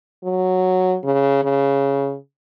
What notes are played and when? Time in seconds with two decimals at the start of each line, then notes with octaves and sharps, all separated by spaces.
0.24 F#3
1.04 C#3
1.44 C#3